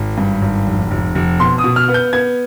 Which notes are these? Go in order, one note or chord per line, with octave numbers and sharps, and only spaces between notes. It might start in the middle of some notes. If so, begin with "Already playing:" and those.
Already playing: G#1
G2
G#1
F1
F1
F1
B2 C6
D#6
B2
F6
B3
G6
B3 G#6